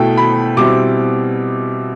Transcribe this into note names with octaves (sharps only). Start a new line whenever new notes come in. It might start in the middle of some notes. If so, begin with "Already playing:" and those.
Already playing: B2 A3 E4 G5
B5
B2 G3 C4 E4 D6